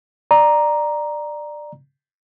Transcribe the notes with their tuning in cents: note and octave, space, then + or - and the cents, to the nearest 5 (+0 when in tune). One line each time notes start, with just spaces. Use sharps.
D5 +15 A#5 +5